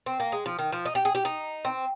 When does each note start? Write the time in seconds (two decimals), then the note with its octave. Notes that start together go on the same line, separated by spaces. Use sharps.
0.06 C4
0.20 A#3
0.32 G#3
0.46 F3
0.59 D#3
0.72 F3
0.86 D#4
0.95 G4
1.05 G#4
1.15 G4
1.25 D#4
1.65 C4